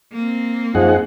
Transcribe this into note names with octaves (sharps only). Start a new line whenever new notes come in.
A#3 C4
F#2 F3 D#4 G#4 F#5